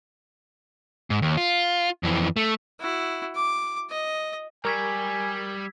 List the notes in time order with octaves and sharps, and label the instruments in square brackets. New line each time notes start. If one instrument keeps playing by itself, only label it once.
[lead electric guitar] G#2
D#2
F4
F2 E3
A3
[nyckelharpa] E4 F#4
D6
D#5
[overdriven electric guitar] G3 [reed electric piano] A#4 C#6 [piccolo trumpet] G#5 [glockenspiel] E6 G#6 B6